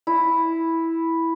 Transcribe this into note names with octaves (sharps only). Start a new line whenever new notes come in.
E4